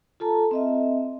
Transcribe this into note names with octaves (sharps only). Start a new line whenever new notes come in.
F4 A4 A5 A#5
C4 D#5 E5